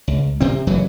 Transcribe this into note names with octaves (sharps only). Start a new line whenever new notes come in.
C#2
C3 C4
F#1 F#2 E3 F#3